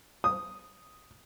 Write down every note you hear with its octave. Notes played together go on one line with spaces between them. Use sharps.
D#6